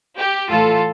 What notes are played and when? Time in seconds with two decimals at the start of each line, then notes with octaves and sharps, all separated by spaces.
0.18 G4
0.49 A2 E3 A3 F4 A4